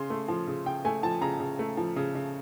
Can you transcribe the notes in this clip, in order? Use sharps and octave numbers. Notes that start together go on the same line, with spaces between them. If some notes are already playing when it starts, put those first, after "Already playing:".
Already playing: C#3 C6
A3
F3
C#3
C#3 G5
A3 G#5
F3 A5
C#3 A#5
C#3
A3
F3
C#3
C#3